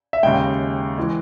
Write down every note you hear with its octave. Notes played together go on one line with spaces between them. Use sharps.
E5
D#2 C#3 G#3 G5
E3 G#3